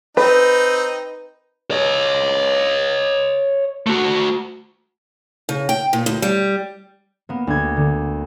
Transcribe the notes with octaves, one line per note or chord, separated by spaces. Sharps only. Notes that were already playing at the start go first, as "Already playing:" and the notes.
C4 D#4 B4
C#5 D#5
A3 F#4
C#3
G5
A#2
D2
G3
A#3 B3
D2 G#6
D3